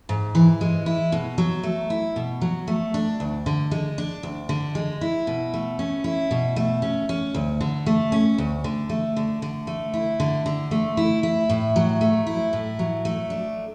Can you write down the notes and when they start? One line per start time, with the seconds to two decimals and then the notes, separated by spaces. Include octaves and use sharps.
0.09 G#2
0.35 E3
0.61 G#3
0.86 E4
1.12 B2
1.38 F#3
1.63 A3
1.90 E4
2.16 B2
2.41 F#3
2.68 A3
2.94 D4
3.20 D2
3.46 D3
3.71 G#3
3.98 D4
4.23 D2
4.49 D3
4.75 G#3
5.01 E4
5.27 B2
5.54 A3
5.79 C#4
6.04 E4
6.31 B2
6.56 A3
6.82 C#4
7.09 C#4
7.35 D2
7.61 D3
7.86 A3
8.12 C#4
8.38 D2
8.64 D3
8.89 A3
9.16 D3
9.42 D3
9.67 A3
9.94 E4
10.20 D3
10.46 D3
10.71 A3
10.97 E4
11.23 E4
11.49 A2
11.76 F#3
12.01 A3
12.27 E4
12.53 A2
12.79 F#3
13.05 A3
13.30 D4